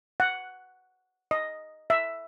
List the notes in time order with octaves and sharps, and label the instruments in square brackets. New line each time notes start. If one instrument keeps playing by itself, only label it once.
[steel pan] F#5
D#5
E5